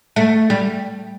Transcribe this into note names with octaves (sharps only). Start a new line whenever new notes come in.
A3
G3